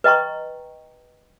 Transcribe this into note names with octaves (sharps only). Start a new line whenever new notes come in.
B4 D#5 G5 A#5 C#6